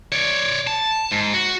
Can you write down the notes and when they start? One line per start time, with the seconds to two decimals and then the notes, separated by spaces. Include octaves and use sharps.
0.12 C#5 D5
0.67 A5
1.12 G#2
1.34 F#4